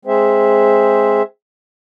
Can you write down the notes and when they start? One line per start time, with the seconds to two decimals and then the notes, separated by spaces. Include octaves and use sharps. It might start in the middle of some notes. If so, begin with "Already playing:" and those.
0.05 G#3 C4 G#4 C5 E5